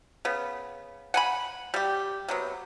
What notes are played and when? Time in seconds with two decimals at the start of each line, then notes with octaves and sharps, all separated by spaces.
0.25 C#3 B3
1.14 F#5 G#5 B5
1.74 G3 G4
2.28 C3 F#3 B3